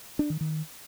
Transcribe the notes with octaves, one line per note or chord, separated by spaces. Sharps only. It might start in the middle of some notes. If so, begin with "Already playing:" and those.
D4
D#3
D#3